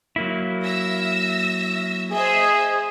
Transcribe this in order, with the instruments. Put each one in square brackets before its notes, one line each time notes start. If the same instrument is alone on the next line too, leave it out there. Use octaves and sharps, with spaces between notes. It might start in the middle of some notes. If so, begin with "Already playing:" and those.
[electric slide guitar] F#3 A#3 E4
[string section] E5 E6 A#6
[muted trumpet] G#4 [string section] C5 D#5 E5